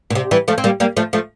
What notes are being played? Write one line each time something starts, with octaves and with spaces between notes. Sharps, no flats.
A#2
C3
E3 G3
F3 A3
C4
G3 A#3
G3 A#3
F3 A3
F3 A3